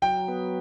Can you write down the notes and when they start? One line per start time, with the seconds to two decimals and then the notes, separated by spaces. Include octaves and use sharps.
0.02 F#3 G5
0.28 B3